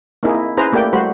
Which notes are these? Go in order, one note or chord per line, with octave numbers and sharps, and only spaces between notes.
A#3 C4 D#4 E4 G#4
E4
C#4 E4 G#4 B4 C5 A#5
A3 A#3 G4 D5 G5
G3 A3 F#4 C5 B5